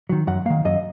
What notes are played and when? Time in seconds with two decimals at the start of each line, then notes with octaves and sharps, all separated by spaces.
0.09 D#3 F#3
0.27 F#2 F#5
0.46 D#3 A#3 F5
0.65 F#2 D#5